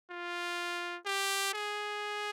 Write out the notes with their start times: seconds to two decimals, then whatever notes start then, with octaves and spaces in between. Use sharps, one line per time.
0.11 F4
1.06 G4
1.54 G#4